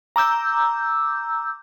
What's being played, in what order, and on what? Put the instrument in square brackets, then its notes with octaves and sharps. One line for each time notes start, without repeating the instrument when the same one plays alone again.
[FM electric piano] A#5 D6 E6 G6